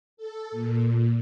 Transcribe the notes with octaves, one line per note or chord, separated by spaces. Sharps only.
A4
A#2